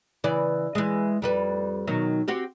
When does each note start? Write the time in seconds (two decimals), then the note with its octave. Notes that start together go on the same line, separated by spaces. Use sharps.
0.24 C#3 E3 D5
0.75 E3 G#3
1.22 F2 G3 B4
1.87 B2 D#3 F#3
2.28 C4 F#4 G4